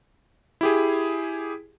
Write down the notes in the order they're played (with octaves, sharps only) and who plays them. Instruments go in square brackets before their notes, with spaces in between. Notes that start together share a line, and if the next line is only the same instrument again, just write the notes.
[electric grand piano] E4 G4 G#4